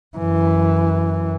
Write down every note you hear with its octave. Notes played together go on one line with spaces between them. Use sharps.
F#2 E3